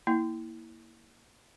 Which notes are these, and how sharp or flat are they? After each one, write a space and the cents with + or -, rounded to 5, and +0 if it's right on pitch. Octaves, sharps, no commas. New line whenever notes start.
A#3 +0 E4 -20